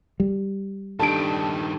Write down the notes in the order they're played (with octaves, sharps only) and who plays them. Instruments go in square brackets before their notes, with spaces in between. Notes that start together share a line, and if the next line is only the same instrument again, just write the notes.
[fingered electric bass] G3
[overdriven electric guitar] G2 D#3 [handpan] D4 G4 A4 [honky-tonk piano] A5 D7